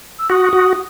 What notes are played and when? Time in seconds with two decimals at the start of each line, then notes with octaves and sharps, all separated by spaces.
0.19 E6
0.30 F#4 D#6
0.53 F#4